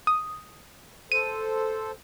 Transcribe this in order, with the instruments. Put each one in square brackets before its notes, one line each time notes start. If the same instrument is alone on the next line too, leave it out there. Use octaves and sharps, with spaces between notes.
[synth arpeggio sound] D#6
[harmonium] A4 C5 [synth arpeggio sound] D#7